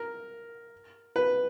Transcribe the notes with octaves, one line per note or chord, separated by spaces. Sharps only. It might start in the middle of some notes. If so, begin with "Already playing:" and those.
Already playing: A#4
B4